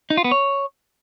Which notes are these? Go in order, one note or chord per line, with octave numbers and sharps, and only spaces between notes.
D#4
F4
B3
C#5